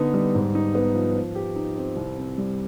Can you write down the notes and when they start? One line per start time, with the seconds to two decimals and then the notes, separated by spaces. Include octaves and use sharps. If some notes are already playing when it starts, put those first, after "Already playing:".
Already playing: D3 B3 D#4
0.14 G3
0.35 G#2
0.55 D#4
0.75 B3
0.95 F3
1.15 F3
1.35 G4
1.56 D#4
1.77 C4
1.96 C2
2.18 C4
2.38 G3